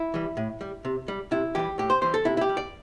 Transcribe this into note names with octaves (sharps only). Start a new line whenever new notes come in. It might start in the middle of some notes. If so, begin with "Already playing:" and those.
Already playing: E4
E3 G3
A2
G3
C3
G3
C3 E4
E3 G3 G4
A2 G4
C5
E3 G3 C5
A4
C3 E4
E4
G4
G3
D5